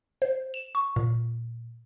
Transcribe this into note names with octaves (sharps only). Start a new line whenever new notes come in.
C5
E7
C#6
A#2